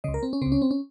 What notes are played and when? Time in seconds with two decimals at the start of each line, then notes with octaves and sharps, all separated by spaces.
0.04 C#2 C#3 D#5
0.14 A#4
0.23 C4
0.33 C#4
0.42 C#2 C#3 C4
0.52 C#4
0.62 C4
0.71 C#4